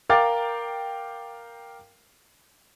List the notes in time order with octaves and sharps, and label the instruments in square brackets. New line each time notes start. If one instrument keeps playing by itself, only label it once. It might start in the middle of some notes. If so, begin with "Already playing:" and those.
[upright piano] A#4 F5 G5 D6 A6